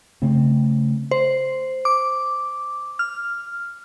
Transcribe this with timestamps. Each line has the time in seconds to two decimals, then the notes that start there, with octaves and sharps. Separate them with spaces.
0.22 C#3 A3 C4
1.11 C5
1.85 D6
2.99 F6